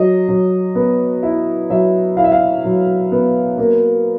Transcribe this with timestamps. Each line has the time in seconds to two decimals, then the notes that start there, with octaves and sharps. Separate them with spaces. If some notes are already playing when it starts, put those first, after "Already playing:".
Already playing: F#3 D#5
0.29 F#3
0.75 B3
1.23 E4
1.70 F#3 E5
2.17 E4 F5
2.24 E5
2.32 F5
2.64 F#3
3.12 B3
3.58 A#3